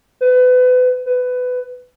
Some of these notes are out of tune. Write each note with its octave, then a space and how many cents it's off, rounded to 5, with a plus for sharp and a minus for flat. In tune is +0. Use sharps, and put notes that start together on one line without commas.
B4 +30
B4 +20